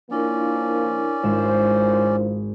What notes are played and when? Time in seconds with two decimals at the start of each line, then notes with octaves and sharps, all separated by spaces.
0.11 F3 A#3 C#4 D4 E4 A#4 D5
1.23 G#1 G#2 F4 C5 E7